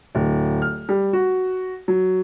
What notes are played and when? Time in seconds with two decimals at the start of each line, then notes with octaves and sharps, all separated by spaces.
0.15 D1
0.62 F6
0.89 G3
1.13 F#4
1.88 F#3